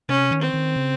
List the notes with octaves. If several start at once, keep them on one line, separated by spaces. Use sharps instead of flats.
C3 C#4
D#3
C4
D#3
C#3